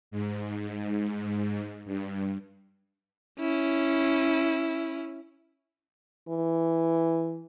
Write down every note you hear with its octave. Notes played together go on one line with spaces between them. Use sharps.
G#2
G2
C#4 E4
E3